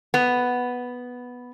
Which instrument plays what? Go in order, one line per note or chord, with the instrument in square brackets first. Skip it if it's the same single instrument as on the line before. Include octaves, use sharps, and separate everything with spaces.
[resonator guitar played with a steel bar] B3